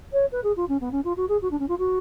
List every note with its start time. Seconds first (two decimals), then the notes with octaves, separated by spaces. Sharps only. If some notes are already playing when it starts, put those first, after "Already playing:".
0.13 C#5
0.32 B4
0.44 G#4
0.56 F4
0.69 C#4
0.81 B3
0.92 C#4
1.04 F4
1.17 F#4
1.29 G#4
1.42 F#4
1.51 D4
1.59 C#4
1.68 F4
1.79 F#4